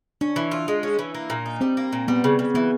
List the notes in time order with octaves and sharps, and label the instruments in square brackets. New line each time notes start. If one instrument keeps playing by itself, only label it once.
[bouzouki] C#4 [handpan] D4
[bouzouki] E3
F4
G#3
C#4
E3
A#3
A#2
D#4
[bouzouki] G3 [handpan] C4
[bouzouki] A#3
A#2
[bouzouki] G3 [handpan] B3
[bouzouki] C#3
C#3
[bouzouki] E3 [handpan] B3